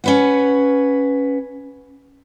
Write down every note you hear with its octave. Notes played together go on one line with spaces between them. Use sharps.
C#4 B4 F#5